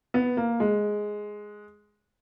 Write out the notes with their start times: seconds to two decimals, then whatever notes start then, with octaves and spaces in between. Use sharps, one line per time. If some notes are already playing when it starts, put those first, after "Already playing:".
0.14 B3
0.37 A#3
0.60 G#3